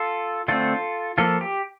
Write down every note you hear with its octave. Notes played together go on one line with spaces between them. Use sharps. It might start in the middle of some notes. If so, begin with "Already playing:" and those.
Already playing: F4 A4
D3 A3 C4 F4 A4
F3 A#3 F4 A4
G4